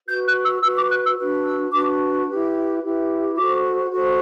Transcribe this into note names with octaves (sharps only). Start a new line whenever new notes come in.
F#4 B4 G6
F#6
E6
F#4 B4 E6
D6
F#6
E6
D4 F#4 B4
E6
D4 F#4 B4 D6
E4 G4 B4
E4 G4 B4
F#4 A4 C5 D6
F#4 A4 C5